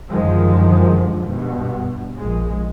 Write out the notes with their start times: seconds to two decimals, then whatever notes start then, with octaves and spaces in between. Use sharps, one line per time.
0.10 F#2 D3 D#3 F3 G#3
1.27 G2 B2
2.17 A#1 G#3